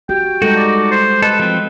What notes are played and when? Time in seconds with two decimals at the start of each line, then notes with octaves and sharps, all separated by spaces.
0.09 F#4 G4 G5
0.42 G3 G#3 D#4 F#4 A4
0.57 D5
0.91 C5
1.22 A4 B4 D#5
1.39 F3 C4